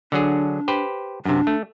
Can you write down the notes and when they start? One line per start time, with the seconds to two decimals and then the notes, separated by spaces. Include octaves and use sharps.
0.12 D3 F#3 D4 G#4
0.68 G4 B4 C5
1.25 F#2 C3 D4
1.47 A3